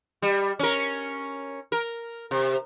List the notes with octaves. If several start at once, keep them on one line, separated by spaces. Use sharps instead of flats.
G3
C#4 A#4
A#4
C3